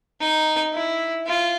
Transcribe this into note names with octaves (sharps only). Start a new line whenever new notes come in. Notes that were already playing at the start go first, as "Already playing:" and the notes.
D#4
E4
F4